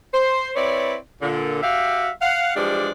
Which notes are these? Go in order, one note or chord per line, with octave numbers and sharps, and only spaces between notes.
C5
C4 E4 B4 C#5 D5
A#2 D3
F#4 G4 E5 F5
F5 F#5
E3 F3 G3 G#3 D4 D5